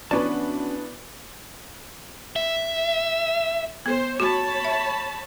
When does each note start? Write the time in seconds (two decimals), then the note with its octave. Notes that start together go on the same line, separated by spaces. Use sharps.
0.11 E3 B3 C#4 D4 F#4 B4 D5 A5
2.36 E5
3.86 B3 C5
4.20 F#4 C#5 A5 B5
4.65 E5